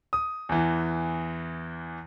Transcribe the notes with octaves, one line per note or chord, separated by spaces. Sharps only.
D#6
E2 E3